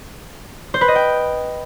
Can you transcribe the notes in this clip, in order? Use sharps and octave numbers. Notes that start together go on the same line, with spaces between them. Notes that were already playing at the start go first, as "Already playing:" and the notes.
C5
B4
D#5
G5